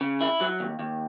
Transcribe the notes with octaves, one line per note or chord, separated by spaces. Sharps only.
C#3
E4
F#3
D#2
D#2